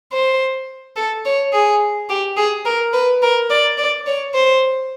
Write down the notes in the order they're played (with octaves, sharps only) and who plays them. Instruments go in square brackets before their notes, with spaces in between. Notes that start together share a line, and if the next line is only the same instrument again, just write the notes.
[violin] C5
A4
C#5
G#4
G4
G#4
A#4
B4
A#4
D5
D5
C#5
C5